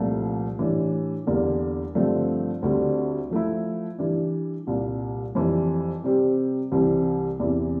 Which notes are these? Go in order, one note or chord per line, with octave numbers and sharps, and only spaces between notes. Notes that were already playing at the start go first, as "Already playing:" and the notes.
Already playing: C2 A#2 F3 A3
A2 E3 G3 D4
E2 D3 G3 A#3
G2 D3 F3 A3 C4
D2 D3 G3 C4
F3 A3 E4
E3 G3 D4
C2 A#2 G3
F2 E3 G3
C3 G3 C4 G4
C2 C3 E3 G3 C4
E2 C3 E3